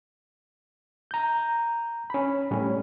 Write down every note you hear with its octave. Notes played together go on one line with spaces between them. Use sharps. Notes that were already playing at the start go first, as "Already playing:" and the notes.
A#5 G6
C#4 B5
A2 G3 C#4